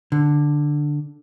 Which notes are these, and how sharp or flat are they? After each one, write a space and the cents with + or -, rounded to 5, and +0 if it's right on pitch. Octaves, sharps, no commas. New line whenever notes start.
D3 +5